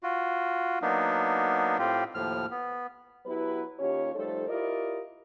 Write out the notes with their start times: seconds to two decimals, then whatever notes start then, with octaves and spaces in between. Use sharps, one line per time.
0.03 F4 F#4
0.82 F#3 A#3 B3 D4 D#4
1.79 A2 C4 F4 G4
2.15 D#2 A2 F3 F6
2.51 B3
3.26 F#3 B3 E4 G4 B4
3.79 D#2 C#4 F4 G4 C#5
4.14 F3 G3 A3 D#4 A4 C5
4.48 E4 F4 G4 A#4 D5 D#5